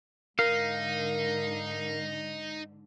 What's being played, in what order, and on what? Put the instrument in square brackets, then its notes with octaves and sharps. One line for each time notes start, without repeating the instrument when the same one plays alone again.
[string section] G#2 D3 [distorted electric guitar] D#4 [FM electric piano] A#4 [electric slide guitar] F5